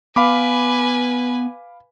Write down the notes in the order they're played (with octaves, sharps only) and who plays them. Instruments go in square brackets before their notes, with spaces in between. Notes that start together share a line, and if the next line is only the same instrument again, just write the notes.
[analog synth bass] B3 [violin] B4 G#5 [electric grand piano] F5 B5 D6